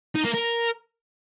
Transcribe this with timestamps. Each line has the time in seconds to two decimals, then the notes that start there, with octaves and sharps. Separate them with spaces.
0.15 D#4
0.24 A#3
0.34 A#4